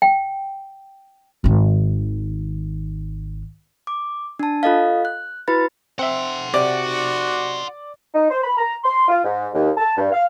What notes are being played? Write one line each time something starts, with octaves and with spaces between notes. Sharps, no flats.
G5
G#1 D#3
D6
D4 A5
F4 A4 D#5 F5
F#6
E4 F#4 B4 B5 A6
C4 E5 F#5 C6
C3 F#4 D5
D#4
C5
B5
A#5
C6
F4
G#2
D#2
A5
G2
F5